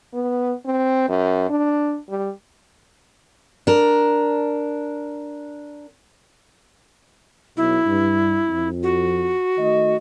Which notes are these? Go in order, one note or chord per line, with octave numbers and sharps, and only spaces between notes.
B3
C4
F#2
D4
G3
D4 A#4
B1 E4
G2
F2
F#4
D#3 A3 D#5